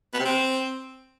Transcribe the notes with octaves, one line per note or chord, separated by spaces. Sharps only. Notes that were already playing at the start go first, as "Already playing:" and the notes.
B3
C3
C4